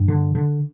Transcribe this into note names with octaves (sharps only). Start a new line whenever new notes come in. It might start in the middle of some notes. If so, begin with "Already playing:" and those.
Already playing: G2
D3
D3